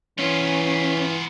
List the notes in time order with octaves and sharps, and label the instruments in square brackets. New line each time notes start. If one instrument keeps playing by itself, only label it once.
[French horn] E3 [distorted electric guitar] B3 F4 [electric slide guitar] C#4